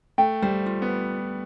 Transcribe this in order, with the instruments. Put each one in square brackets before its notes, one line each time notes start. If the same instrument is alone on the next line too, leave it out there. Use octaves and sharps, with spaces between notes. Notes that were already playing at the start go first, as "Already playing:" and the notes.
[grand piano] A3 [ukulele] G5
[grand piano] G3 [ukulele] C5
[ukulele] F4
[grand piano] B3